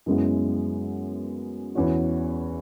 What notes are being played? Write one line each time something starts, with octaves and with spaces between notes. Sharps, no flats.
F#2 C#3 G#3 B3 E4
E2 E3 C#4 F#4